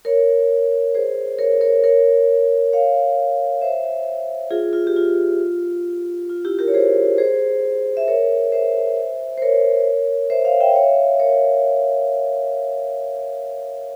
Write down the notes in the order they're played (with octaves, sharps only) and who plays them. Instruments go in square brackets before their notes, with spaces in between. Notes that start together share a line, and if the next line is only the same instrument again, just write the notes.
[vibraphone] A#4 C#5
G#4 C5
A#4 C#5
A#4 C#5
A#4 C#5
C#5 F5
C5 E5
F4 G#4
F4
G4
F4
F4
E4 G4
G4 A#4
C#5
G#4 C5
G#4 C5
E5
A#4 C#5
C5 E5
C5
A#4 C#5
C5 E5
C#5 F5
E5 G5
E5
C#5 F5
A#4 C#5